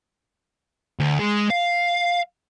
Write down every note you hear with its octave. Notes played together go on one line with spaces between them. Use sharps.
D2
G#3
F5